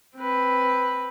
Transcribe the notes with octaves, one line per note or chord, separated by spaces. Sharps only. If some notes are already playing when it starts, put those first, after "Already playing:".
C4 B4